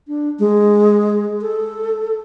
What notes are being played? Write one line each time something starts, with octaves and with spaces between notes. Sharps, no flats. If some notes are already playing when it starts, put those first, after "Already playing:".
D4
G#3
A4